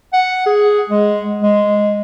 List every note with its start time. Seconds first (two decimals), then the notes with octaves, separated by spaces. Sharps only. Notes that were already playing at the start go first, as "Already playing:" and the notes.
0.13 F#5
0.46 G#4
0.90 G#3
1.42 G#3